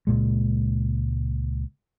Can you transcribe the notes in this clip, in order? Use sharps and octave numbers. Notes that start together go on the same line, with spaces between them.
C#2 A#2 G#3